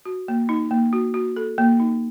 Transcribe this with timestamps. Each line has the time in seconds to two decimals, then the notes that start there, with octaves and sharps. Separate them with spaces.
0.06 F#4
0.28 A#3
0.49 D#4
0.71 A#3
0.93 F#4
1.14 F#4
1.36 A4
1.58 A#3
1.80 D#4